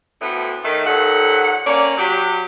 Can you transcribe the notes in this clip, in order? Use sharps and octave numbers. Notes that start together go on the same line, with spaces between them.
D2 A2 B3
D#3 A3
D#2 A#2 A4 F#5
A#3 C#4 D5
F#3 G4